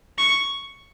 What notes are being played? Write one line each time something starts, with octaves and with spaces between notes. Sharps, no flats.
C#6